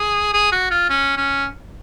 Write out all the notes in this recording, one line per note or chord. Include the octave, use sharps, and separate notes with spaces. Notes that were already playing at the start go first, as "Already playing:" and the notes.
Already playing: G#4
G#4
F#4
F4
C#4
C#4